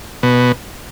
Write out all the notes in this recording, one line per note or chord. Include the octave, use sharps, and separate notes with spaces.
B2